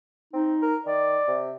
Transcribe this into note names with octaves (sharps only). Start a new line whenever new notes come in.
C4 D#4
A#4
D#3 D5
C3